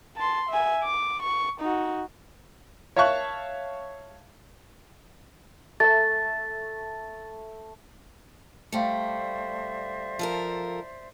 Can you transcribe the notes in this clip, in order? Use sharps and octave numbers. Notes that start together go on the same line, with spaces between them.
A5 C6
E5 G#5
D6
C#6
D#4 F#4
C#5 E5 F5 A5 C#6 F#6
A3 E5 A6
G3 A3 C5 D5 E5 F5 G5 C#7
F3 A4 A#4